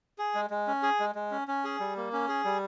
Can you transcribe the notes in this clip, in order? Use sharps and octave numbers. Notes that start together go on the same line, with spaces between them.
G#4
G#3
G#3
C#4
G#4
G#3
G#3
C#4
C#4
G#4
G3
A#3
C#4
G#4
G3